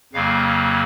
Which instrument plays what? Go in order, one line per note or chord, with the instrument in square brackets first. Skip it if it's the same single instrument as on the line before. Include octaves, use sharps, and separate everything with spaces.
[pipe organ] F2 C#3 F#3 A#3 F5